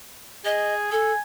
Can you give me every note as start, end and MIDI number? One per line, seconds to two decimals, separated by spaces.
0.45 0.91 68
0.45 0.74 75
0.92 1.12 69
0.92 1.20 80